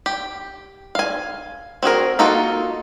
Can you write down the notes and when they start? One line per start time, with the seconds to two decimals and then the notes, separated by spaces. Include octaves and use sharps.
0.06 G4
0.95 F5 G#5
1.83 C4 F#4 G#4 A#4
2.19 A#3 D#4 F4 F#4 A4